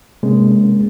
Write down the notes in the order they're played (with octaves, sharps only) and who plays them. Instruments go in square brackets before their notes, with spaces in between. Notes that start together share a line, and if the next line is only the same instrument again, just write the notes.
[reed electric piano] C3 G#3 A#3 C#4